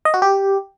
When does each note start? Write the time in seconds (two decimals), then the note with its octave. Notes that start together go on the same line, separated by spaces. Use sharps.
0.05 D#5
0.14 F#4
0.22 G4